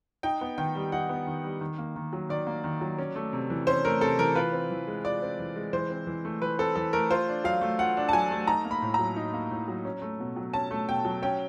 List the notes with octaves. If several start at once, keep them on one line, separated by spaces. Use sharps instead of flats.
D#4 G5
B3
D#3 G5
G3
D#4 F#5
B3
D#3
G3
D#3
A#3
D#3
F#3
D#3 D5
A#3
D#3
F#3
C#4
A3
C3
E3
C#4 C5
A3 A#4
C3 A4
E3 A#4
F4 B4
C4
E3
G#3
F4 D5
C4
E3
G#3
E3 C5
C4
E3
A3
E3 B4
C4 A4
E3 A4
A3 A#4
F4 C5
D4
F#3 F5
A3
F4 F#5
D4
A5
F#3 G#5
A3
D#4 A#5
A#3
B5
A2
F#3 A#5
D#4
A#3
A2
F#3
C#4
A3
B2
F#3
C#4 A5
A3
B2 G5
F#3
C#4 G5